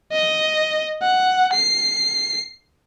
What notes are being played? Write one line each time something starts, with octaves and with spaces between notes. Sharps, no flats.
D#5
F#5
C7